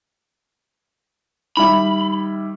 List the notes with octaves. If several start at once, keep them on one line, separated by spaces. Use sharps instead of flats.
D#3 G3 E4 B5